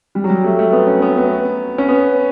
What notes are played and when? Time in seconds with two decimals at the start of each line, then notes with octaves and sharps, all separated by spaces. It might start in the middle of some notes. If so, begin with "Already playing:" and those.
0.15 G3
0.24 F#3
0.30 G3
0.44 A3
0.59 A3
0.72 B3
0.87 C#4
1.02 B3
1.17 B3
1.78 C#4
1.88 B3